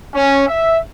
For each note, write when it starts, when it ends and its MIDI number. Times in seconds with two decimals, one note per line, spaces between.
0.14 0.46 61
0.48 0.78 76